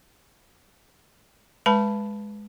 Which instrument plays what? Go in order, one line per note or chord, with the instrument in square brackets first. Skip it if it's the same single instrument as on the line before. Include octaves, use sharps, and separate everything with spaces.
[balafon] G#3 B4 A5 B5